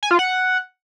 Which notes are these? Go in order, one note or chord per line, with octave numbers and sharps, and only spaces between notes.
G#5
F4
F#5